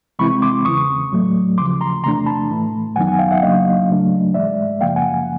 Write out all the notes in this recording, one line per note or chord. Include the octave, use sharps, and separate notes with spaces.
C3 E3 G#3 C4 E4 B5 C#6
C6 D6
E2 C#3 E3 C#6 D#6
A2 F#3 A3
D#2 C#3 F3 C6 D6
A#5 C6
E2 C3 E3 A3 D4 A#5 C6
A5 B5
A2 E3 A3
F#2 D#3 F#3 B3 D#4 F#5 G#5
F#5 G#5
F5 G5
E5 F#5
F2 C#3 F#3 A#3 D4 D#5 F5
C#2 C#3 F#3 A3 D4
G#2 E3 G#3 D5 E5
F#2 C#3 F3 A#3 F5 G5
F#5 G#5